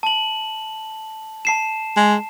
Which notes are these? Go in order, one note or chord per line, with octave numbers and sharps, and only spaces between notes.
A5 F#7
A5 C7 E7
G#3